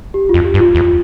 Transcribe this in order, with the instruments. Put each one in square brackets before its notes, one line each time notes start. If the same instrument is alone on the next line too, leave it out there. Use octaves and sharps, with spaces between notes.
[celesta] G4
F4
[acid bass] F2
[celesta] G4
[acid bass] G2
[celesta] F4
[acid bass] E2